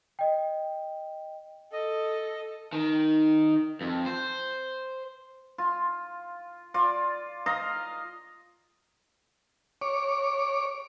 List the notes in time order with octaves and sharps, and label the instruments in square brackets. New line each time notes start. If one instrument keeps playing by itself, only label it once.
[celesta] D#5 G5
[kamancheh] A4 [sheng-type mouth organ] D#5
[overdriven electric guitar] D#3
F2
C5
[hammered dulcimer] F4
F4 D5
D#5 F5 A#5
[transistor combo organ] C#5 D6